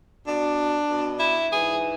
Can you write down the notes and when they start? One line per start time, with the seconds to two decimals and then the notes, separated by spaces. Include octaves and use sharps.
0.27 B2 D4
0.89 B2
1.19 E4
1.50 G#2 E3 G#4